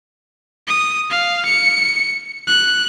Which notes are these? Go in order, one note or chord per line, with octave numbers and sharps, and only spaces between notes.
D#6
F5
C#7
F#6